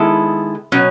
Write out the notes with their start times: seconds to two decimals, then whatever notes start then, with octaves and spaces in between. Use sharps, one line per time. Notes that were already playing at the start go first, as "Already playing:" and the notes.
Already playing: D#3 G#3 B3 E4 A4
0.72 B2 F#3 C#4